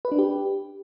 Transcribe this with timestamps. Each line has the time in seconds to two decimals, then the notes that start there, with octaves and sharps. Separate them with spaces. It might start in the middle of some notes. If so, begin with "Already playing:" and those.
0.05 B4
0.12 D4
0.18 G4